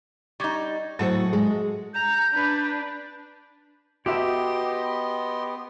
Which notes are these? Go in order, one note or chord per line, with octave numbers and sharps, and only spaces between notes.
G3 D#4 C#6 D6 G#6
A2 F#3 F#4 G#4 A4 C5
G#3
A#5 G6
D4 B4
B3 F#4 G4 A4 D#5 E5 C6